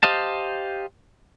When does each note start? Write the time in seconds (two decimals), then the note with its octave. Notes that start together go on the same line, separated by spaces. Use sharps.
0.03 G4 C5 D#5 F5 A5